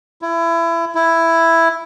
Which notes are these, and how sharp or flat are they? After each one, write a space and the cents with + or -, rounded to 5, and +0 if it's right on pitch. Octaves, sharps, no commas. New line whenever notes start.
E4 +25
E4 +5